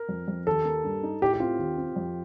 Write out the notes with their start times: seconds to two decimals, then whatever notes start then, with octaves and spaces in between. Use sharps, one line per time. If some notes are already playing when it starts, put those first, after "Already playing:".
Already playing: A#4
0.09 F2
0.28 F2
0.47 D#2 A4
0.65 A#3
0.84 G2
1.03 D#4
1.22 A2 G4
1.34 G4
1.40 C4 F4
1.59 D#2
1.78 C4
1.96 F2